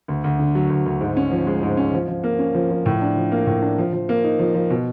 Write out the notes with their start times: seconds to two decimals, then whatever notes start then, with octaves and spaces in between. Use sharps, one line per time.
0.08 D2
0.24 D2
0.39 D3
0.55 F#3
0.70 D2
0.86 D2
1.01 G#2
1.17 C#4
1.32 F3
1.47 G#3
1.63 G#2
1.77 C#4
1.93 F3
2.08 F3
2.24 A#3
2.39 C#4
2.54 F3
2.71 F3
2.86 A2
3.01 D4
3.17 F3
3.32 A#3
3.47 A2
3.62 D4
3.78 F3
3.93 F3
4.09 A#3
4.24 D#4
4.39 F3
4.55 F3
4.70 B2